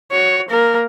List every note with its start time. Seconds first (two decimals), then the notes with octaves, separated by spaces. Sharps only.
0.12 F#4 C#5
0.50 A#3 A#4